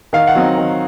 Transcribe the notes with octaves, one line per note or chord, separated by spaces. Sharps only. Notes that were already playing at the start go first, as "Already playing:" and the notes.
D#3 F5
F#5
F#3 C4 D#4
D#3